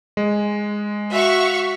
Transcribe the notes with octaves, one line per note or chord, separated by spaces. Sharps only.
G#3
F#4 E5 F5 C#6